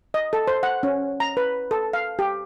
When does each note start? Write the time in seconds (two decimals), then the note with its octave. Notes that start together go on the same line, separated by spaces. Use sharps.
0.14 D#5
0.33 A4
0.48 C5
0.63 F#5
0.83 C#4
1.20 A#5
1.37 B4
1.71 A4
1.93 F5
2.19 G4